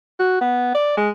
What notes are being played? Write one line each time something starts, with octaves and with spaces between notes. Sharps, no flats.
F#4
B3
D5
G#3